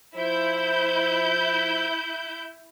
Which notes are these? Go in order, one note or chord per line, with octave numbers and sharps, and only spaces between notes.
F3 E4 C5 G6